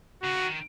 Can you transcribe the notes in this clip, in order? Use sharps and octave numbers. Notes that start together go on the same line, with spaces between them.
C#3 F#4
C#3
D#3